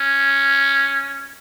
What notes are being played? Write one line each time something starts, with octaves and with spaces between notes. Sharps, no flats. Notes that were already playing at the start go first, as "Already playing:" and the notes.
Already playing: C#4